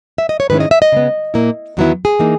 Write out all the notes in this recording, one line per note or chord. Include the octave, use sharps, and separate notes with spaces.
E5
D#5
C#5
G#2 D#3 G#3 C#4 E4 B4
D#5
E5
D#5
C#3 G#3 B3
A#2 A#3 E4
E2 D#3 F#3 B3 E4
G#4
E3 A#3 D#4